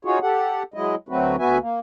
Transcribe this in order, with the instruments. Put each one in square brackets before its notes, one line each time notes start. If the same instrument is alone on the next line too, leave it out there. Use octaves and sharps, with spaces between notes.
[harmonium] D#4 F4 F#4 G#4 C#5
G4 A4 F#5
F#3 G#3 E4 D#5
D2 F#3 A3 C4 F#4 B4
D2 B3 F#4 B4 E5 G#5
A#3